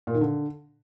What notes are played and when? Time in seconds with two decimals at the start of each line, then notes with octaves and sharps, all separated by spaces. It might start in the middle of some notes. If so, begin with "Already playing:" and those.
0.07 A#2
0.14 D#3
0.21 D3